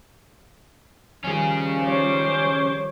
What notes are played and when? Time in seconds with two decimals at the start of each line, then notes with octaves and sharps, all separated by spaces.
1.24 D#3 F3 G3 C#4 G#4
1.85 C5 C#5 D6